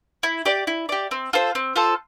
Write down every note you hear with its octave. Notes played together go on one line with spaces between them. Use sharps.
E4
G4 D5
E4
G4 D5
C4
F4 A4 C5
C4
F4 A4 C5